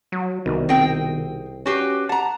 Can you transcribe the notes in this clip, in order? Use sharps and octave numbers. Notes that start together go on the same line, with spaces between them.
F#3
C2 B2 D#3
C4 G#4 G5
C#4 F#4 G4 B4 D6 C7
F#5 A5 A#5